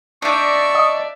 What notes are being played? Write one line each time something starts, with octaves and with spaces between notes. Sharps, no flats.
D4 D#4 D5 E5 C#6
D#5